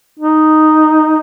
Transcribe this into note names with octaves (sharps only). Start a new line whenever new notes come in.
D#4